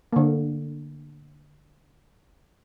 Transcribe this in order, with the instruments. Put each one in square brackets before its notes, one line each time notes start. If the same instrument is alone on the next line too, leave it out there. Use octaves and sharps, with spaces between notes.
[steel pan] D3 A#3